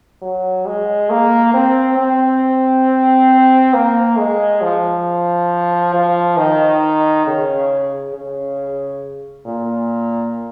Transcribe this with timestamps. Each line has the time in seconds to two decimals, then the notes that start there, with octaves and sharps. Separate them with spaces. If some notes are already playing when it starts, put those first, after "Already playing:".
0.22 F#3
0.66 G#3
1.10 A#3
1.54 C4
1.98 C4
3.74 A#3
4.18 G#3
4.62 F3
5.94 F3
6.37 D#3
7.26 C#3
8.14 C#3
9.46 A#2